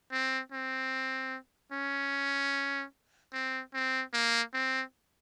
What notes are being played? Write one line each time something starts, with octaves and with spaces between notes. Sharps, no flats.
C4
C4
C#4
C4
C4
A#3
C4